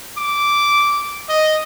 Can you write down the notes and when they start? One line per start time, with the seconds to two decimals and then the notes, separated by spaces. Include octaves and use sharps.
0.17 D6
1.29 D#5